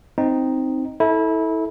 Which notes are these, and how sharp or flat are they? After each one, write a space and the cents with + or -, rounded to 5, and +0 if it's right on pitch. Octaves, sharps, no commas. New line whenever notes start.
C4 +0 D#4 +0
E4 -25 A4 +0